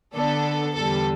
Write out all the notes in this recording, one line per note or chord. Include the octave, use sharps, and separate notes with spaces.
D3 B3 D4 A4
E2 D3 G3 A4